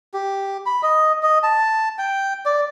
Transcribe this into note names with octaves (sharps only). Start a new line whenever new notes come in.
G4
B5
D#5
D#5
A5
G5
D5